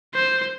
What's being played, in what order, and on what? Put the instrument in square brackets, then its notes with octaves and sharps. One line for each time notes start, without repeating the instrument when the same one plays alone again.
[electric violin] C5